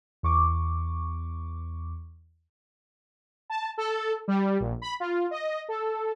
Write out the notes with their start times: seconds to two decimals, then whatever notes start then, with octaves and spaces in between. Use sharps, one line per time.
0.23 E2 C#6 D6
3.50 A5
3.78 A4
4.28 G3
4.60 A#1
4.82 B5
5.00 F4
5.31 D#5
5.69 A4